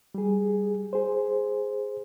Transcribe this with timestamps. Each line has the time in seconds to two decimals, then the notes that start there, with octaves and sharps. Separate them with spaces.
0.15 G3 G#4
0.93 G#4 C5